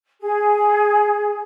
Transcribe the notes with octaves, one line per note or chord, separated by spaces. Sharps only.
G#4